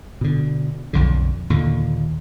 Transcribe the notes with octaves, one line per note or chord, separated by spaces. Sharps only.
B2 D3
B1 F2 D3
D#2 A#2 D3